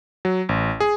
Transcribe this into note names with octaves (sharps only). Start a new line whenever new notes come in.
F#3
A1
G#4